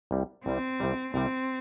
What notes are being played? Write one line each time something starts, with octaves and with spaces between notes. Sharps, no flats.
C2 C3 G3
C2 C3 G3 C4
C2 C3 G3
C2 C3 G3 C4